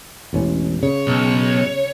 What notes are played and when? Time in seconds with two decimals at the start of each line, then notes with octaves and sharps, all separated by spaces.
0.33 E1 A1 C#4
0.83 C#3 C#5
1.07 B1